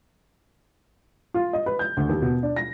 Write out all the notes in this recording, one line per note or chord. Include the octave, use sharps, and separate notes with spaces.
F4
D#5
B4
G6
D2
D#2
B2
D4
A#6